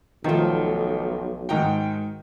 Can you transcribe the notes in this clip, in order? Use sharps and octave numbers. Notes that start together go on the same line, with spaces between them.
B1 D#3 F3 A3 F4
G#2 D#3 F#4 G5 A#5